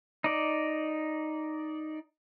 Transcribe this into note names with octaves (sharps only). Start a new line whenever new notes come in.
D#4 D5